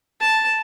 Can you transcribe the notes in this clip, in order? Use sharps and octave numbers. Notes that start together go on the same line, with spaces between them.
A5